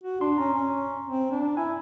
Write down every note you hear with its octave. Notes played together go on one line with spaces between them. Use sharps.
F#4
D4 C6
C#4 A#5
C#4
C4
D4
E4 G#5